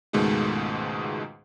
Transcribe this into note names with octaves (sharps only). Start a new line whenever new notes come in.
C#2 G#2 B2 D#3 G#3 A3